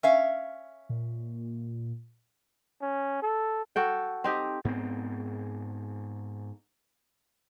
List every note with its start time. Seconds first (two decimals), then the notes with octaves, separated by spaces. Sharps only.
0.03 C#4 E5 F5
0.89 A#2
2.82 C#4
3.22 A4
3.76 F#4 A4 G5
4.24 C4 D#4 G4
4.65 G#2 B3 C4